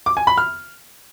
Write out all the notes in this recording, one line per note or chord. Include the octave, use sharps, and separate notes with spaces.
D6
G#5
B5
F6